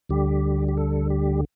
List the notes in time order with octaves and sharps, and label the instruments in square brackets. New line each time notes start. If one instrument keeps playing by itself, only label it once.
[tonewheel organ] D2 D3 G3 G4
G4
A4
G4